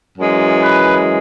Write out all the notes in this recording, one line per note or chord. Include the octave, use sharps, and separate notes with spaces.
F#2 E3 G#3
B4